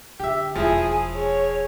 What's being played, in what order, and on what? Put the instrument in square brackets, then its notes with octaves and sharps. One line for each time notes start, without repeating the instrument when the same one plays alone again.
[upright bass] D3 [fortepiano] G4 E5
[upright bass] E1 G#3 [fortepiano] F3 E4 [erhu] G#4
[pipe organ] G#4 [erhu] C#5